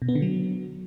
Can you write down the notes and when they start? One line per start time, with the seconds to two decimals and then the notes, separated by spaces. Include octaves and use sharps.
0.02 B2
0.09 B3
0.15 D3
0.22 F#3